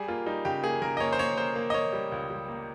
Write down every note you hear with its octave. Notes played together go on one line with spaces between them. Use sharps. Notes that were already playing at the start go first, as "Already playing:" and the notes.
Already playing: G3 G#4
A#3 F4
G3 D#4
C#3 G4
A#3 G#4
C#3 A#4
D#5
A#3 C#5
C5
A#3 C#5
A#3 C5
A#3
D#5
A#3 C#5
G3
C#2
G3
A#3